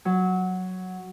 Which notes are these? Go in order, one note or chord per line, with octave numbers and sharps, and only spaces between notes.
F#3